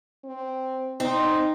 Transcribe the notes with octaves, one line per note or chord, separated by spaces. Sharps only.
C4
C4 D#4